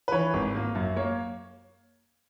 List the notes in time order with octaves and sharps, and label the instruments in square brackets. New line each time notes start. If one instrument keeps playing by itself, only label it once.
[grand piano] B4
E3 C#5
G#1
A#3
F#2
A#3 C#5